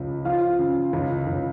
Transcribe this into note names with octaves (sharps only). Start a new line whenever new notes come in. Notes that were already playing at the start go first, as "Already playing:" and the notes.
Already playing: C#2 F3
F3 F4 F5
C#3
C#2
C#2